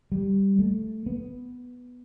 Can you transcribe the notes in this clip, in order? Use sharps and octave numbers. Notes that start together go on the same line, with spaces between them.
G3
A3
B3